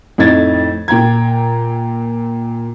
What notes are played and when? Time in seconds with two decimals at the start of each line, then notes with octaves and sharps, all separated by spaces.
0.18 F2 A2 D#4 G#6 A6
0.88 A#2 G5 A#5 G#6